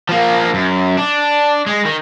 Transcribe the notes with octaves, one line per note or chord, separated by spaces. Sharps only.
F3 A#3
F#2
D4
G#3
D#3